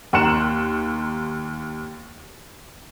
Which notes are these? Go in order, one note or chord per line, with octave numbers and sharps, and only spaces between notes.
D#2 A#5 C6 F#6 C#7 E7